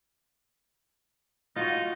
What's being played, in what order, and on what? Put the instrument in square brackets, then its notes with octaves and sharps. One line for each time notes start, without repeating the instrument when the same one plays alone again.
[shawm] D#4 [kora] F4 F#4